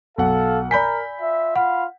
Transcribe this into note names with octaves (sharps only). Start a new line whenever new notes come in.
B1 A4 F5 F#5
A#4 D5 G#5 B5 G6 B6
F4 E5
F4 F5 F#5 B5